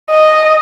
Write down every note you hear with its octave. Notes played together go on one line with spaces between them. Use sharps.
D#5